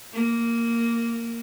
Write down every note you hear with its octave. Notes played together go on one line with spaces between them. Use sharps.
A#3